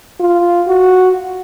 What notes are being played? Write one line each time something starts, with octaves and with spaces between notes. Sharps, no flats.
F4
F#4